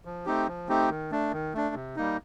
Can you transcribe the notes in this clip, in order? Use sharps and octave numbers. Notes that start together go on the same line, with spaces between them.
F3
A3 C4 D#4 G4
F3
A3 C4 D#4 G4
D#3
A3 D4
D#3
A3 D4
C3
G3 A#3 D#4